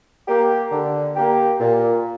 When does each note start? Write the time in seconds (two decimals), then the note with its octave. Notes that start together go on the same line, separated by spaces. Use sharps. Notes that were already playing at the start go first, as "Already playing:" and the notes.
0.27 A#3 G4
0.72 D3
1.16 A#3 G4
1.60 A#2